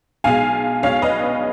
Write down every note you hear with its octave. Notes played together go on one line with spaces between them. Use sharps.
B1 B2 G#3 F5 G#5
B1 B2 G#3 C#5 F5
B4 D#5